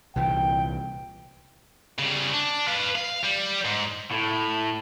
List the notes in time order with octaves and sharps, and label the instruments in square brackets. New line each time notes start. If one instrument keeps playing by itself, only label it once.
[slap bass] C2 A#2 E3 [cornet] G5
[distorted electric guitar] C#3 G3
D4
B4 F5
F5
G3
G#2
[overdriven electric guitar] A2